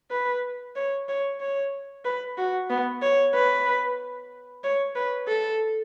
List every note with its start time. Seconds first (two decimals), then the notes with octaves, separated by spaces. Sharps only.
0.11 B4
0.76 C#5
1.09 C#5
1.40 C#5
2.05 B4
2.37 F#4
2.70 B3
3.02 C#5
3.34 B4
4.64 C#5
4.95 B4
5.28 A4